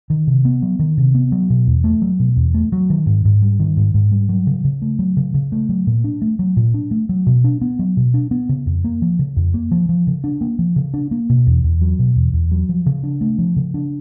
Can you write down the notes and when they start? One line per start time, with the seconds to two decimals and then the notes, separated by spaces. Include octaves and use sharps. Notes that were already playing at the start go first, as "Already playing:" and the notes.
0.10 D#3
0.27 C3
0.45 B3
0.62 F#3
0.79 D#3
0.97 C3
1.15 B3
1.32 F#3
1.50 B2
1.67 E2
1.84 A3
2.02 F#3
2.19 B2
2.36 E2
2.54 A3
2.72 F#3
2.90 D#3
3.06 G#2
3.25 G#2
3.42 G3
3.60 D#3
3.77 G#2
3.94 G#2
4.12 G3
4.29 F#3
4.47 C#3
4.64 C#3
4.82 A3
4.99 F#3
5.17 C#3
5.34 C#3
5.52 A3
5.69 F#3
5.87 A#2
6.04 D4
6.22 A3
6.39 F#3
6.57 A#2
6.74 D4
6.91 A3
7.09 F#3
7.27 B2
7.44 D4
7.61 B3
7.79 F#3
7.97 B2
8.14 D4
8.31 B3
8.49 C#3
8.66 F2
8.84 A#3
9.02 F3
9.19 C#3
9.36 F2
9.54 A#3
9.71 F3
9.89 F3
10.07 C#3
10.24 D4
10.41 A#3
10.59 F3
10.76 C#3
10.94 D4
11.11 A#3
11.29 B2
11.47 E2
11.64 E2
11.81 F#3
11.99 B2
12.16 E2
12.33 E2
12.51 F#3
12.69 F3
12.86 C#3
13.03 D4
13.21 A3
13.38 F3
13.56 C#3
13.74 D4